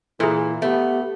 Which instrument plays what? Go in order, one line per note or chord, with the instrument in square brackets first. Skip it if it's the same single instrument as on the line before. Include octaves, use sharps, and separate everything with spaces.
[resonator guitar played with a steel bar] A#2 [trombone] E3 [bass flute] F4 [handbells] G#4 A4
[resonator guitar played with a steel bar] A3 [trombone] B3 [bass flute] G4